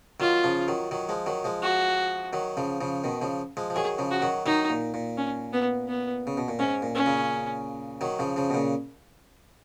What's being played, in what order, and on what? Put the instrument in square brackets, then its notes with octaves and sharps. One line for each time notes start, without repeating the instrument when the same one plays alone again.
[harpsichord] D#3 F#3 [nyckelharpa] F4
[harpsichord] C#3 F3
D#3 F#3
D#3 F#3
F3 G#3
D#3 F#3
F3 G#3
[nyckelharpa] F#4
[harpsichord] D#3 F#3
C#3 F3
C#3 F3
B2 D#3
C#3 F3
F3 G#3
F3
[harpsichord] D#3 F#3 [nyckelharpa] G#4
[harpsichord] C#3 F3
[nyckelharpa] F#4
[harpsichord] D#3 F#3
[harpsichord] D#3 F#3 [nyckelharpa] D#4
[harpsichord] A#2
A#2
[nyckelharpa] C#4
B3
B3
[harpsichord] C#3
B2
A#2
[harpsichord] G#2 [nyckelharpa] C#4
[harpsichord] A#2
[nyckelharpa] C#4
[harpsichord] A#2 C#3
D#3 F#3
C#3 F3
C#3 F3
B2
A#2 C#3